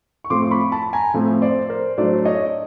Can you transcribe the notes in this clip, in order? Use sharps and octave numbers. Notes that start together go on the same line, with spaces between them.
C#6
A2 F3 A3 C4 C6 D6
B5 C#6
A5 B5
G#5 A#5
A2 F3 A3 C4
C5 D5
A#4 C5
A2 F#3 A3 D4 C5 D5
C#5 D#5